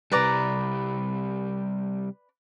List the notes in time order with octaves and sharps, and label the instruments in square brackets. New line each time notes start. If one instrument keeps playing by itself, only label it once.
[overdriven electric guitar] C3 G3 [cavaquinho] B4 D5 A#5